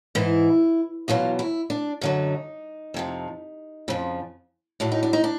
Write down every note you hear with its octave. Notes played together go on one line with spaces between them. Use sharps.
G#2 E3 E4
E2 B2 F#3 F4
E4
D4
F#2 D3 F#3 D#4
F2 C3 F3
F2 C#3 F3
A2 F#3 D4
D#4
D4
D#4
D4